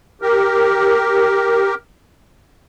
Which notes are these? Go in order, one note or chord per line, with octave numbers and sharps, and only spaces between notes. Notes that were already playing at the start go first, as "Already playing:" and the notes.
G4 A#4